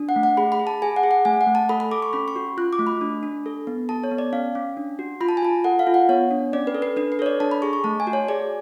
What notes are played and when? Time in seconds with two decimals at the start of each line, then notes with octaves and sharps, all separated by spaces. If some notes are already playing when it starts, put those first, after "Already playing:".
Already playing: D4
0.09 F#5
0.16 A3
0.23 F#5
0.37 G#4 B5
0.52 B5
0.59 G#4
0.67 A5
0.82 G#4 G#5
0.96 F#5
1.03 G#4
1.11 F#5
1.25 A3 G#5
1.41 F#5
1.47 A3
1.55 A5
1.69 A4 B5
1.80 B5
1.91 A4 D6
2.02 C#6
2.13 C#4 B5
2.28 C#6
2.36 F#4
2.57 F4 F#6
2.73 D6
2.79 A3
2.87 B5
3.01 D4
3.23 D4
3.46 A4
3.67 B3
3.89 A4 A5
4.04 C#5
4.11 B3
4.18 D5
4.33 C#4 F5
4.55 C#4
4.77 D4
4.99 F#4
5.21 F4 B5
5.29 A5
5.37 G#5
5.43 F4 A5
5.64 A4 F#5
5.79 F5
5.87 F4
5.94 F#5
6.09 B3 C#5
6.31 D4
6.53 C#4 D5
6.67 B4
6.75 A4
6.82 B4
6.97 D4 B4
7.12 B4
7.19 A4 C#5
7.26 D5
7.40 D4 A5
7.51 B5
7.62 G#4 C#6
7.73 C#6
7.84 A3 A5
8.00 G#5
8.07 F#4
8.13 C#5
8.28 G#4 D5